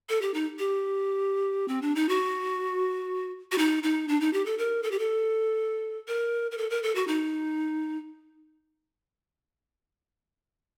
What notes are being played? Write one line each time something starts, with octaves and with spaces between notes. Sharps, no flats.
A4
G4
D#4
G4
C4
D4
D#4
F#4
F#4
D#4
D#4
D4
D#4
G4
A4
A#4
A4
G4
A4
A#4
A#4
A4
A#4
A4
F#4
D#4